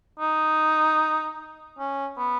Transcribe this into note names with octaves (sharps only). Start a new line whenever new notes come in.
D#4
C#4
B3